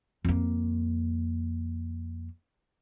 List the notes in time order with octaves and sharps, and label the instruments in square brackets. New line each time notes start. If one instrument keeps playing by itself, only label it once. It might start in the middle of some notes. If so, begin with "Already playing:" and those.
[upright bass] F2 A#3